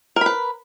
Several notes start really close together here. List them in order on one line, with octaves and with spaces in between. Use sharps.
A#4 B5 B4